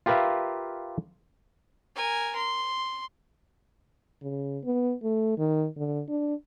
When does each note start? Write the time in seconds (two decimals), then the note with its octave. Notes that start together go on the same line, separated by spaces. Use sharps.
0.06 F4 G4 A#4 B4 E5 F5
1.96 A#4 G#5
2.35 C6
4.22 C#3
4.64 B3
5.03 A3
5.38 D#3
5.77 D3
6.08 D4